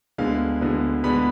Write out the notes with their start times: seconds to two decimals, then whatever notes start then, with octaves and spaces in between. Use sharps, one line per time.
0.18 D2 D3 G#3 B3 F5
0.61 D2 D3 G#3 B3
1.04 D3 G#3 B3 B5